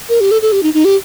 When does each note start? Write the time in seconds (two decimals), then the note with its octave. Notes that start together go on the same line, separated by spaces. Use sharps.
0.09 A#4
0.21 G4
0.31 A4
0.42 A4
0.52 G4
0.63 D#4
0.74 D#4
0.85 G4